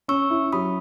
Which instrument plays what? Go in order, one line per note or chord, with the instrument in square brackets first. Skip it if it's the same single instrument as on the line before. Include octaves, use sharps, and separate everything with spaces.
[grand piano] C#4 [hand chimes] C#6 E6
[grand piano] E4
[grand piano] F#3 [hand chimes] B5 D#6